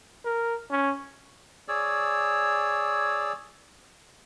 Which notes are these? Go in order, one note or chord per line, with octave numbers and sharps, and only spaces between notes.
A#4
C#4
G#4 C#5 D5 E6